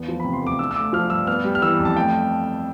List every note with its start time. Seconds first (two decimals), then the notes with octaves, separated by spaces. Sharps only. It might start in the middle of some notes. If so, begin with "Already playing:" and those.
Already playing: E2 B3
0.08 F3
0.20 C3 B5
0.33 C6
0.41 D2
0.47 D6
0.59 D4 E6
0.71 E6
0.76 A3 D6
0.93 F3 F6
1.10 G2 E6
1.27 B3 F6
1.44 G3
1.55 F6
1.62 E3 E6
1.79 F2
1.85 A5
1.96 A3 G5